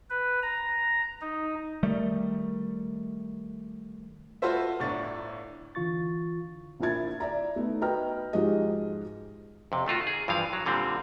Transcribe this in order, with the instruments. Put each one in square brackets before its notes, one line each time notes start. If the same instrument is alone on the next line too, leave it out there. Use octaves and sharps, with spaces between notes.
[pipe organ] B4
A#5
D#4
[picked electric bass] D#3 G3 A3
[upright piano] F4 F#4 A4 B4 C5 E5
G1 A2 D4 C#6 A6
[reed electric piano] D3 E3 F4 C#6 A6
[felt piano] A#1 A#2 A#3 E4 G#6 A6
D5 E5 A#5
A3 B3 D#4
F#4 B4 D#5 G5 A#5 F6
G#2 F3 G#3 F#4 G4 D#5
[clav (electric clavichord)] F2 C3
D#3 A3 F4 F#4
G#4
G2 E3 F3 F5
F#3
A#2 D3 G3 C4